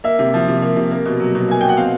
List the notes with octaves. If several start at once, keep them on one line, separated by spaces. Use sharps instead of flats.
A#3 E5
C3
F3
C3
A#3
C3
A#3
B2
F#3
B2
A#3 G#5
B2 G5
F#5
C4 F5